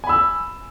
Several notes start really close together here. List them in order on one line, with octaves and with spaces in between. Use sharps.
G#5 B5 E6